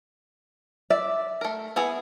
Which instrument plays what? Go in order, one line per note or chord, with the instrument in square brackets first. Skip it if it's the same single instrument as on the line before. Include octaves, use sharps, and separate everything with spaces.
[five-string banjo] D5 [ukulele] E5
[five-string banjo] A3 A#4
B3 E4 G#4